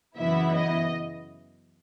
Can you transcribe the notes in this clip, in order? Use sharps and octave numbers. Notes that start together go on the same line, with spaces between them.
F#2 C#3 E3 B3 E4 E5
D#5